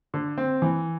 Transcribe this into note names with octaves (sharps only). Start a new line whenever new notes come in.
D3
C4
E3